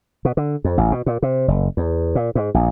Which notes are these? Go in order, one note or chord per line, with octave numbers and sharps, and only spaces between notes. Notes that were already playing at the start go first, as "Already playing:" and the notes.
B2
D3
F2
A1
B2
A#2
C3
F#1
E2
A#2
G#2
A#1